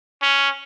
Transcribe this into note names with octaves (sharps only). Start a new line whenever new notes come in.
C#4